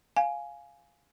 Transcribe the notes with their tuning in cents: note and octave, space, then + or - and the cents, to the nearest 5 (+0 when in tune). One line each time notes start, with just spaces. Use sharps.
F5 +0 G#5 +10